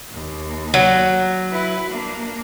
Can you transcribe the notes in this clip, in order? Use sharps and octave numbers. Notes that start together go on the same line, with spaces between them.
D#2
F#3
E4 B4
A#3 D4